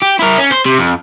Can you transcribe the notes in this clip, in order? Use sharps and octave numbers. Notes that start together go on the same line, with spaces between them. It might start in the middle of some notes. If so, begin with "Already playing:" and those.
G4
E4 A#4
C#4
C5
C3
F2